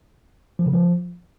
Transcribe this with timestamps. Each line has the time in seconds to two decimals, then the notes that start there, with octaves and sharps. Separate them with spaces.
0.59 F3
0.66 C#3
0.73 F3